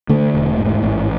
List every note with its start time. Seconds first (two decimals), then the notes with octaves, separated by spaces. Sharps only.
0.09 D3 A3
0.34 E1
0.58 G#2
0.83 A1